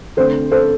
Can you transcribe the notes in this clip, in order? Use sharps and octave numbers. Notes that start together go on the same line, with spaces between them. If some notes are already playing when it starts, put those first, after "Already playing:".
D3 A3 C4 A4 C5
A4 C5